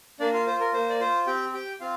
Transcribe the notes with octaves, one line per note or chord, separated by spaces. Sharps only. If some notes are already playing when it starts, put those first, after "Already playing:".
A#3 D4 D5
F4 F5
F4 C5
A#4
A#3 C5
D5
F4 C5
C4 G4 G5
G4 G5
C4 F4 F5